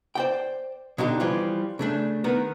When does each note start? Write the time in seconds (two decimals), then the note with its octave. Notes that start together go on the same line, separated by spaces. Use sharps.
0.15 C5 D5 G5
0.98 B2 D3 D4 D#4 G4
1.20 E3 F3 G3 F4
1.79 C#3 A3 D4
2.24 D#3 B3 A#4